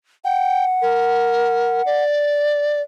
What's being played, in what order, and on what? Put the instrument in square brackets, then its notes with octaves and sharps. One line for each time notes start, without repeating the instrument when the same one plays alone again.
[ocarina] F#5 [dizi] G5
[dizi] A#4
D5